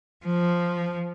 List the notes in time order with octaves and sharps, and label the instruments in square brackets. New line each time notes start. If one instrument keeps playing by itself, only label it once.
[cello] F3